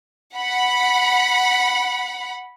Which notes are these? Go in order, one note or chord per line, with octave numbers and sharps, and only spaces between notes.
F#5 B5